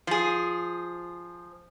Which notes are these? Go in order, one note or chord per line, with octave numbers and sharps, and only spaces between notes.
F3 G#4